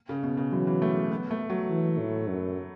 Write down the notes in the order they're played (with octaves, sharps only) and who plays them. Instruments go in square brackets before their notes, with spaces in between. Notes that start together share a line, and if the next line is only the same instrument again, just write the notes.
[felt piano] C#3
B2
C#3
[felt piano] E3 [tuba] F#3
[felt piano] E3
A3
B3
A3
F#3
[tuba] E3
A2
F#2